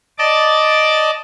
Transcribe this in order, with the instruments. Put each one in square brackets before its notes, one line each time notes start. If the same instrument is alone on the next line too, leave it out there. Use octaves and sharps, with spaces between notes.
[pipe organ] D5 D#5 A5 D6